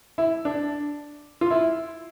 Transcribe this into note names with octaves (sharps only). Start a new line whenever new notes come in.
E4
D4
F4
E4